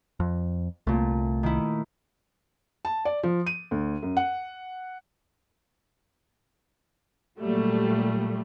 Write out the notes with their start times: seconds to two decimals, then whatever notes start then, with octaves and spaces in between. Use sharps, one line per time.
0.20 F2
0.87 C2 A#2 A3
1.43 D#3 E4
2.85 A5
3.05 D5
3.23 F3
3.47 D#7
3.71 D2
4.02 F#2
4.17 F#5
7.39 A#2 F#3 G3 A3